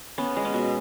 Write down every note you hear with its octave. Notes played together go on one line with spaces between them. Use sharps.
B3 C#4
G#3
C#4
B2